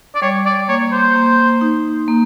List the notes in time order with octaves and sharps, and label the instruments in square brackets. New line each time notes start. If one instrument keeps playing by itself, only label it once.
[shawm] D5
[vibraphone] G3 [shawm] C#5
[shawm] D5
[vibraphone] A#3 [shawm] C#5
[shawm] C5
[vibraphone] A#3
D#4
A#3